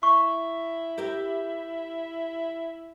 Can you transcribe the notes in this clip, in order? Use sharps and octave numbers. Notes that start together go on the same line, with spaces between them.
E4 C#6
G4 A#4 E5